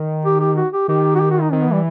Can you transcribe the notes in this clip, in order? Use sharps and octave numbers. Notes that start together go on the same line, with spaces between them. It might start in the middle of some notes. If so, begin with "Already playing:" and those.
Already playing: D#3
G4
G4
F#4
G4
D#3 G4
F#4
G4
F#4
D#4
D#3 C4
B3
E3 G3